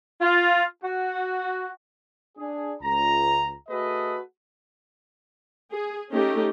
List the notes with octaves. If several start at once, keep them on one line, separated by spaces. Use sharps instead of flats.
F4
F#4
D4 G#4
C#2 A#5
A3 F#4 G#4 A4 B4 D#5
G#4
A3 C#4 D#4 G4